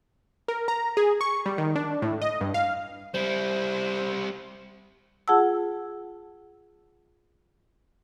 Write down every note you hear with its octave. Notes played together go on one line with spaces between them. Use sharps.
A#4
A#5
G#4
C#6
G3
D#3
D4
A2
D#5
G2
F5
G3 E4 C5
F4 G#4 F#5 A5 E6